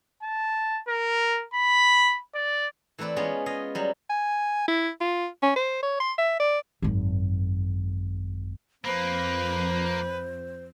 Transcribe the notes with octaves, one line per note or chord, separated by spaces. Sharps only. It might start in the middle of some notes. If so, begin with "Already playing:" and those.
A5
A#4
B5
D5
E3 A3 C4 B4 D5
G#3 B3 C#4 F4 G#4
F4 G#4 D#5
F#3 G3
G#5
E4
F4
C#4
C5
C#5
C6
E5
D5
G#1 F#2
F2 A#3 B4 C5